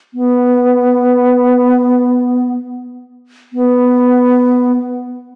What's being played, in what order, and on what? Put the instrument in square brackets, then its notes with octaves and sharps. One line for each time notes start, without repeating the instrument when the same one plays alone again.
[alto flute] B3
B3